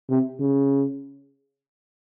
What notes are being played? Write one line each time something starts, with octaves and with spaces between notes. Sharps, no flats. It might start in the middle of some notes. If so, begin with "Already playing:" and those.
C3
C#3